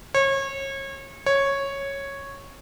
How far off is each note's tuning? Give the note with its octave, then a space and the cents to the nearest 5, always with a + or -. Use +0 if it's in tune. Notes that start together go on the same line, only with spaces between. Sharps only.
C#5 -30
C#5 -5